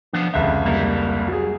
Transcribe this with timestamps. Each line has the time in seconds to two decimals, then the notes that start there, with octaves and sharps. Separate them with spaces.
0.13 F3 B3 D4
0.34 F1 C#2 D3 E5
0.66 G3 A#3 E4
1.28 F#3 G#4